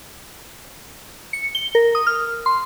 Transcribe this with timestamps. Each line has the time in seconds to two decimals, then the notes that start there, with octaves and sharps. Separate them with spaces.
1.33 C#7
1.55 G7
1.75 A#4
1.95 D#6
2.07 F6
2.46 C6